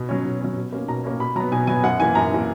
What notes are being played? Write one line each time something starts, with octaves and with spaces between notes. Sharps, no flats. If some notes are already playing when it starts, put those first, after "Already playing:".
Already playing: B2
F#3 C#4
B2
F#3 C#4
B2
A#3 C#4
B2 A#5
A#3 C#4
B2 B5
F#3 B3 A#5
B2 G#5
F#3 B3 G#5
F#2 F#5
E3 A#3 G#5
F#2 A#5
E3 A#3